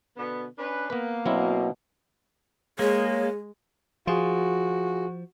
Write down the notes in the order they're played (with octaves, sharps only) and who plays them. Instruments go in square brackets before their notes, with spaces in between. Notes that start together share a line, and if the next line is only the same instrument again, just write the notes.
[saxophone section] B2 D3 B3
C#4 D4 B4
[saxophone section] A#3 [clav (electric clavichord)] B3 B4
[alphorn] B2 [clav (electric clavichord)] F#3 C4 E4
[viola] G#3 [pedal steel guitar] A#3 [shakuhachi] G#4 [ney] C#5
[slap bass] F3 [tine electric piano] F4 G#4 [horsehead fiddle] F#4